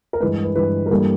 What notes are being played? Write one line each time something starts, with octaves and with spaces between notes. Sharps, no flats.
A#4
G2 E3 G#3 B4
B4
G2 E3 G#3 B4
A#4
G2 E3 G3 A#3 A4